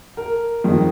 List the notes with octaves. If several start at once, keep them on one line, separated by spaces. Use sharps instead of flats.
A#4
F2 D#3 G#3